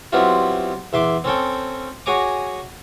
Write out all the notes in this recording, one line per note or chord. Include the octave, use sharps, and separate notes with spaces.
F#3 G3 B3 C4 E4 F4
E2 E5 C6 D6
C4 C#4 A4 G5
F#4 G#4 C#5 G#5 A#5 D6